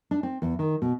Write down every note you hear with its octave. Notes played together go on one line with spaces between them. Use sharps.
D4
C4
E2
D#3
B2